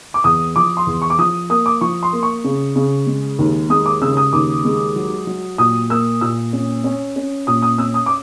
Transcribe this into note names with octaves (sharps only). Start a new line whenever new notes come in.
D6
E2 D#6
F3 D6
C6
E2
C#6
D6
F3 D#6
A#3 D#6
D6
F3 C#6
C6
A#3
C#6
C#3
C#3
G#3
D#2
G#3 D#6
D6
C#3 E6
D#6
D#2 D6
G#3
F#3
F#3
A#2 D#6
A#3 E6
A#2 E6
C#4
C#4
C#4
A#2 D#6
D#6
C#4 E6
D#6
D6